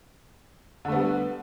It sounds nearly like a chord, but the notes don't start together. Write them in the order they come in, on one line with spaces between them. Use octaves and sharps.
D3 A3 B3 G3